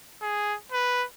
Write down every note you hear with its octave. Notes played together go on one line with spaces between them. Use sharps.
G#4
B4